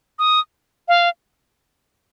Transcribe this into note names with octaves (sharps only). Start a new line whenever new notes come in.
D#6
F5